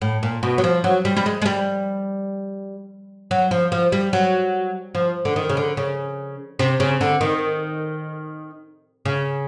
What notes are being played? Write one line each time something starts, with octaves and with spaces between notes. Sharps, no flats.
A2
A#2
B2
F#3
F3
F#3
G3
G3
G#3
G#3
G3
F#3
F3
F3
G3
F#3
F3
D3
D#3
C#3
D3
C#3
C3
C#3
D3
D#3
C#3